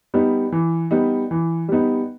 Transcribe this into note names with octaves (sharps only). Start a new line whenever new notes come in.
G3 B3 D#4
E3
G3 B3 D#4
E3
G3 B3 D#4